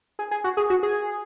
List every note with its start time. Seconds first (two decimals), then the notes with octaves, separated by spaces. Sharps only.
0.19 G#4
0.31 G#4
0.44 F#4
0.57 G#4
0.70 F#4
0.83 G#4